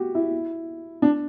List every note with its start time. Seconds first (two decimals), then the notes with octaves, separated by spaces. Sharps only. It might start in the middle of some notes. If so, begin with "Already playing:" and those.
Already playing: F#4 G4
0.15 E4
1.02 D4